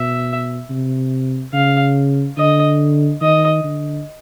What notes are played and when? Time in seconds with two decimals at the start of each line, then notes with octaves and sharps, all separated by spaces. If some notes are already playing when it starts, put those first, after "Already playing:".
Already playing: B2 E5
0.70 C3
1.53 C#3 F5
2.37 D3 D#5
3.21 D#3 D#5
3.64 D3